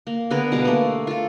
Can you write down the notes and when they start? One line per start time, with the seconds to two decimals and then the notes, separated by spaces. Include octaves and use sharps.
0.07 A#3
0.30 D3 B3 G#4 A#4
0.52 B2 G3 F5
0.65 A3 A#3
1.07 F4 A4